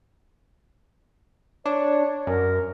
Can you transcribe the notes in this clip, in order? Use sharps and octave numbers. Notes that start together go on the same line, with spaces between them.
D4 C#5
F#2 A#4